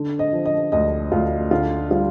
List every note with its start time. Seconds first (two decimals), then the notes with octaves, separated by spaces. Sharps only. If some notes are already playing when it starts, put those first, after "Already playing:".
Already playing: D3
0.19 D#5
0.33 F3
0.45 D#5
0.72 D2 D#5
1.12 D2 F4
1.51 D3 F4
1.91 G3 F4